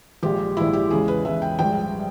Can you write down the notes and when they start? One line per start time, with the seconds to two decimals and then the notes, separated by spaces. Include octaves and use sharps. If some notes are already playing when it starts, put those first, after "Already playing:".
0.23 A#1 A#2 G#3 G4
0.57 A#1 A#2 G#3 E4
0.73 G4
0.90 E2 C#3 G#3 G#4
1.08 B4
1.25 E2 C#3 G#3 E5
1.42 G5
1.59 A#1 G#2 G3 G5
1.94 G3